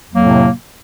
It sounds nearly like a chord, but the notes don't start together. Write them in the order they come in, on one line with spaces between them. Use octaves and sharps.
F2 F#3 A#3 C3 A2